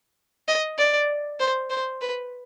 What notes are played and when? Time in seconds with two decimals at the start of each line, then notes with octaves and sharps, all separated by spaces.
0.48 D#5
0.78 D5
1.40 C5
1.70 C5
2.01 B4